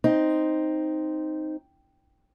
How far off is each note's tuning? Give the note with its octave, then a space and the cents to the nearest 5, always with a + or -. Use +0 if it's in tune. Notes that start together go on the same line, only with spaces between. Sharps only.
C4 +0 D#4 +0